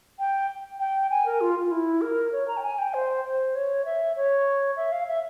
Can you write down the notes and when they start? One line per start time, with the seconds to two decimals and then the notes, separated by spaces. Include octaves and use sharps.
0.19 G5
0.80 G5
1.10 G#5
1.26 A#4
1.41 F4
1.64 F4
1.71 E4
2.01 A#4
2.33 C#5
2.48 A#5
2.57 G5
2.63 G#5
2.79 G5
2.94 C5
3.24 C5
3.55 C#5
3.85 E5
4.16 C#5
4.77 E5
4.92 F5
5.08 E5